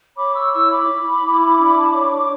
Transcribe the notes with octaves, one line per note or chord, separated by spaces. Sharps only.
C#5 B5 D6
C#6 E6
E4 C#6 E6
B5 D6
E4
E4
D4
A5
C#5 B5
C#6
D6